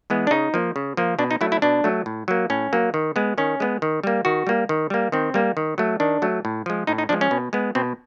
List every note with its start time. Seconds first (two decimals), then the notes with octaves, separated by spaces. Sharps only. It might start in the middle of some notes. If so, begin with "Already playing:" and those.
0.10 E3 G#3 B3
0.27 D4
0.31 C#3 D#4
0.54 F3 A#3
0.76 C#3
0.97 F3 A#3
1.19 B2 D4
1.31 D#4
1.41 F#3 A3 E4
1.52 E4
1.62 B2 D4
1.84 F#3 A3
2.06 A2
2.28 F#3 A#3
2.50 A2 C#4
2.73 F#3 A#3
2.94 D#3
3.16 G#3 B3
3.38 D#3 C#4
3.60 G#3 B3
3.82 D#3
4.04 G3 A#3
4.25 D#3 F#4
4.47 G3 A#3
4.69 D#3
4.90 G3 A#3
5.12 D#3 C4
5.34 G3 A#3
5.57 D#3
5.78 F#3 A3
6.00 D#3 D4
6.22 F#3 A3
6.45 A2
6.66 F3 G#3
6.87 A2 D#4
6.98 D#4
7.09 F3 G#3 D4
7.21 C#4
7.31 B2
7.53 G#3 B3
7.75 B2 C4